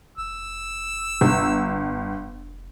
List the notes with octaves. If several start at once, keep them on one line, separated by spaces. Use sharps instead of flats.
F1 E6
G1